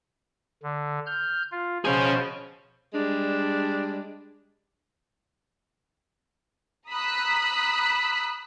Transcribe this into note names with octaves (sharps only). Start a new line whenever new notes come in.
D3
F6 G6
F4
B2 F3 C#4 G#4 C5
G3 G#3 D4
A#5 B5 D#6 E6 F#6 B6